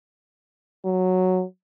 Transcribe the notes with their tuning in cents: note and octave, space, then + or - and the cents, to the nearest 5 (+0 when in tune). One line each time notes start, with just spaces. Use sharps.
F#3 -5